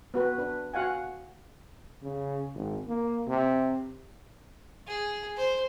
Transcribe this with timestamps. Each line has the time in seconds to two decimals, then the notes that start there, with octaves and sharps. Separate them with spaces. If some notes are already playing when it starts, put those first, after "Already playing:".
0.14 B3 F#4 B4
0.38 D4 B4
0.74 F#4 F5 F#5 G#5
2.03 C#3
2.55 G#1
2.88 A#3
3.28 C3
4.87 G#4
5.36 C5